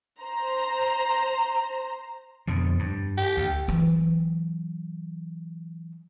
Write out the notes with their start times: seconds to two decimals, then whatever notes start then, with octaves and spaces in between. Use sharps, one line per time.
0.22 C5 A#5
2.47 F2 B2 D3
2.79 G2
3.18 G4
3.37 D2
3.68 E3 F#3